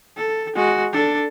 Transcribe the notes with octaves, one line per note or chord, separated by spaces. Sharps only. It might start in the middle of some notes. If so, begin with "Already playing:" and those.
A4
G#3 F#4
D4 A4